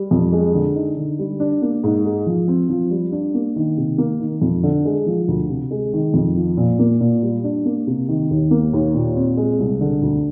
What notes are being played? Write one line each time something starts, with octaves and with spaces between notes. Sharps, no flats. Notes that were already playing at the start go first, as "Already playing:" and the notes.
Already playing: G3
F2
G#3
D3
D#4
D3
G3
D4
A#3
G#2
G#3
F3
C4
F3
G3
D4
A#3
D#3
C3
A#3
D#3
F2
D3
G#3
F3
D2
C3
G#3
D#3
F2
F3
A#2
A#3
A#2
G3
D4
A#3
C3
D#3
D#2
A#3
D#2
A#2
C4
G#3
C2
D3
D2